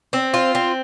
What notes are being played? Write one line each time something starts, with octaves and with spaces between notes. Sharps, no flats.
C4
F4
C4